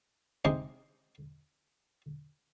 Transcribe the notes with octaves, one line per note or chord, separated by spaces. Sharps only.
C3 G#3 D#4 D#5